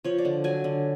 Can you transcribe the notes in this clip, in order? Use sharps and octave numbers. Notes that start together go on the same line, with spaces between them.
F3 C#5
D5
D3
F#3 G#5
D3